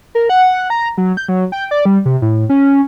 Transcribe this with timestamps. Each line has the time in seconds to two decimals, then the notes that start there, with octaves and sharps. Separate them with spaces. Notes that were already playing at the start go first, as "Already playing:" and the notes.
0.15 A#4
0.29 F#5
0.70 A#5
0.98 F#3
1.17 G6
1.29 F#3
1.52 G5
1.71 D5
1.85 G3
2.05 C3
2.22 A2
2.50 C#4